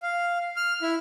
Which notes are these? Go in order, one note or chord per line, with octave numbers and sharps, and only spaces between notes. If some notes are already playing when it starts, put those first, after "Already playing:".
F5
F6
E4